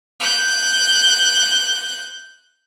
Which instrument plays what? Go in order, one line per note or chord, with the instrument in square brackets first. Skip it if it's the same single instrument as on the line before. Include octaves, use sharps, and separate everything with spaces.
[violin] F#6 G6